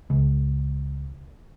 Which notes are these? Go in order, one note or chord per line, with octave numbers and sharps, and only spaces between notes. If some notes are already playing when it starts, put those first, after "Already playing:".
C#2